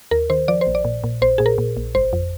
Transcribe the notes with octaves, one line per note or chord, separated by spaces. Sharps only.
D#2 A#4
D#3 C5
F3 D5
C5
A#1
D5
A#2
A#2
A#1 C5
A#2 G#4
A#4
A#2
A#1
G1 C5
F2